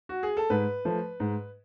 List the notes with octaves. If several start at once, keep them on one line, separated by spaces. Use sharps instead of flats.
F#4
G#4
A4
G#2 B4
F3 A3
G#2